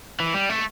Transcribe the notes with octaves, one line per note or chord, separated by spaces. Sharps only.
E3
G3
A3